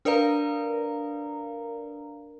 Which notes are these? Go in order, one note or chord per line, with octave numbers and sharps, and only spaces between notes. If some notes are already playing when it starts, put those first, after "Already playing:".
D4 A#4 B4 D5 F5 A#5